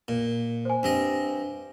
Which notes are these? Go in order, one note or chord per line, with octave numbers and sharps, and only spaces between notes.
A#2
C5 G#5
G2 C4 D#5